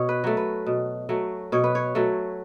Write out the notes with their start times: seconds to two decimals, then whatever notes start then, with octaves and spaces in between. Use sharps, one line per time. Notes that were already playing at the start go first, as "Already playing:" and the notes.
Already playing: B2 C#5
0.09 B4
0.24 F#3 A3
0.37 B4
0.66 B2
1.09 F#3 A3
1.52 B2 C#5
1.64 B4
1.75 C#5
1.95 F#3 A3